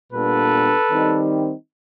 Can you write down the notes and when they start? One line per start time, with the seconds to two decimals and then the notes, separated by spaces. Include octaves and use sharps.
0.13 A#2 G3 B3 D4 A4 B4
0.91 D#3 G3 C4 D#4